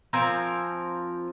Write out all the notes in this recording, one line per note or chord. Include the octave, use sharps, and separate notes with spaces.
F3 C4 A#4 G#5